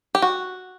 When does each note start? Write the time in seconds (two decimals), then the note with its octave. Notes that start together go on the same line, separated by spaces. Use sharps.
0.15 G4
0.22 F#4